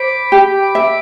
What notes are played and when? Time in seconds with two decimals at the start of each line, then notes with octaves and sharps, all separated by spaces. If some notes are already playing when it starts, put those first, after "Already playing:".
Already playing: C5 B5 D6
0.32 G4
0.75 E5